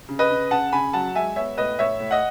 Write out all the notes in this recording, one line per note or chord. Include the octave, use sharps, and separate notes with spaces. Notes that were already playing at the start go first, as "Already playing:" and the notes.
C#3
B4 D#5
C#3
C#3 F#5 A5
C#3 G#5 B5
F#3 F#5 A5
G#3 E5 G#5
B3 C#5 E5
A2 B4 D#5
A2 C#5 E5
A2
D#5 F#5